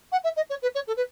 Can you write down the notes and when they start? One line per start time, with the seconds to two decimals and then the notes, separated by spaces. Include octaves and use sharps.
0.12 F#5
0.24 E5
0.36 D#5
0.50 C#5
0.62 B4
0.75 C#5
0.87 A4
0.96 B4